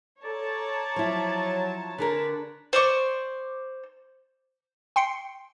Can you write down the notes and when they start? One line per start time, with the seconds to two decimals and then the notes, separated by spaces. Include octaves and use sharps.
0.24 A4 C#5 D5 A5 A#5
0.96 F3 F#3 E4
1.98 D3 D4 G#4 A#4 B4
2.73 C5 D5 C#6
4.96 G5 C6 C7 C#7